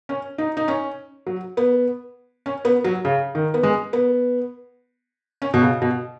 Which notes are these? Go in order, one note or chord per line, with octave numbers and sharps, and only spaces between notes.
C#4
D#4
D#4
C#4
F#3
B3
C#4
B3
F#3
C#3
D#3
B3
G#3
B3
C#4
B2
C#3
B2